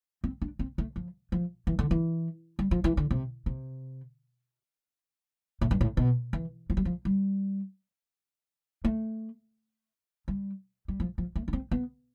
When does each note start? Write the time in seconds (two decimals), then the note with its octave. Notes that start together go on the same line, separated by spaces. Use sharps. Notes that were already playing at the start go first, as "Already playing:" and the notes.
0.24 C4
0.42 D4
0.59 C4
0.78 A3
0.96 F3
1.32 F3
1.67 E3
1.79 D3
1.91 E3
2.59 G3
2.71 F3
2.84 E3
2.97 D3
3.11 C3
3.46 C3
5.61 A2
5.71 G2
5.81 A2
5.97 B2
6.33 E3
6.70 F3
6.77 G3
6.85 F3
7.05 G3
8.85 A3
10.28 G3
10.88 G3
11.00 F3
11.18 F3
11.36 A3
11.48 D4
11.53 C4
11.71 B3